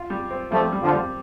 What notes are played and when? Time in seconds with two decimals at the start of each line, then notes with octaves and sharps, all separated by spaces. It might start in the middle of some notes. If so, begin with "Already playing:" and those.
Already playing: F4
0.10 G3
0.31 C4
0.51 F3 G3 A3
0.72 G3
0.82 D3 F3
0.93 G3